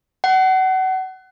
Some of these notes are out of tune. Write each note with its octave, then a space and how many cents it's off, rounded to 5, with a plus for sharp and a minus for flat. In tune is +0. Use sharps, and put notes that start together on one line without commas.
F#5 +30